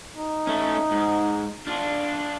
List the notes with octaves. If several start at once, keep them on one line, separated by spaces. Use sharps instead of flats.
D#4
A3 C#4
G#2
D4 F4